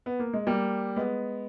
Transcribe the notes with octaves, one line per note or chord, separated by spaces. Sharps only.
B3
A#3
G#3
G3 A#3
G#3 B3